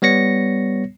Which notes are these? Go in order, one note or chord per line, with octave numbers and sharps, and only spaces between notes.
G3 B3 C#5 A#6 C#7